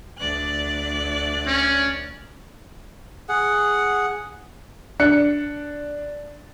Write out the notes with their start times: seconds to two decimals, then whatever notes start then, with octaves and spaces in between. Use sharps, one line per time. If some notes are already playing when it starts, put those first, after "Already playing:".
0.18 D2 D5 F#6
1.47 C#4
3.29 G#4 F#5
5.00 D4 F#6 C#7